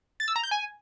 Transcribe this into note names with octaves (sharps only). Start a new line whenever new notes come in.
A6
E6
A#5
G6
G#5